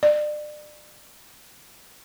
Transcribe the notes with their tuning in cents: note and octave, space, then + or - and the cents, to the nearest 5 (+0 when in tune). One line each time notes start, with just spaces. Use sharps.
D5 +30